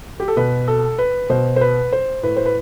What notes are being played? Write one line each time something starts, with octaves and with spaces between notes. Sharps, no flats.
G4
A4
B2 B4
A4
B4
B2 C5
C5
B4
C5
A2 B4
C5
B4